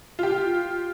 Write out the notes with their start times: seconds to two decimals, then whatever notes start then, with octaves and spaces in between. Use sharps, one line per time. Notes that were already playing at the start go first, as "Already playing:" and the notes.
0.19 F4 G4